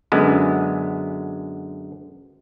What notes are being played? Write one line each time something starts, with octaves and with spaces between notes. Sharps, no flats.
F#2 D3 G#3 B3